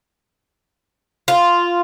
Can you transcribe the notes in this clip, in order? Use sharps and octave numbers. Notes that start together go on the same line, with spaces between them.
F4